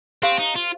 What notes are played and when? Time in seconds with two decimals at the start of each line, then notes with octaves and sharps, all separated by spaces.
0.22 C4 G4 C5 F5
0.39 D#4
0.56 F4